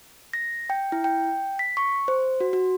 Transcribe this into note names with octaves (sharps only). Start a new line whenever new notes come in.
A#6
G5
E4
G5
B6
C#6
C5
F#4
F#4